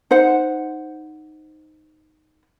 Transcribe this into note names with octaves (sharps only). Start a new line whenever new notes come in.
D#4 C5 F#5